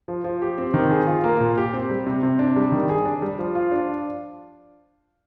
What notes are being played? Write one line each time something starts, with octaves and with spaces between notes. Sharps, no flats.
F3
F3
G4
C4
D#3
G#4
F4
A#3
A#2
G4
C4
G3
C3
C3
D4
G3
D#3
G#4
D4
G3
F3
F4
D4